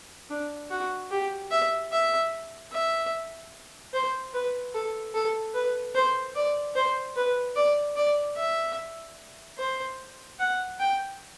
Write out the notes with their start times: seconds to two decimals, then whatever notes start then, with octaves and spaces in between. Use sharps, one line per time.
0.30 D4
0.70 F#4
1.11 G4
1.51 E5
1.92 E5
2.72 E5
3.93 C5
4.33 B4
4.74 A4
5.14 A4
5.54 B4
5.95 C5
6.35 D5
6.75 C5
7.16 B4
7.56 D5
7.96 D5
8.37 E5
9.58 C5
10.39 F#5
10.79 G5